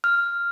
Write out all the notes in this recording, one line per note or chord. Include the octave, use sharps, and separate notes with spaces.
F6